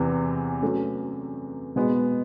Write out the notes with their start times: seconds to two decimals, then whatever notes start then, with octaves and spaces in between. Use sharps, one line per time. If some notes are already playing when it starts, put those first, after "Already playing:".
Already playing: E2 C3 E3
0.62 F#3 A3 C#4
1.76 B2 G#3 B3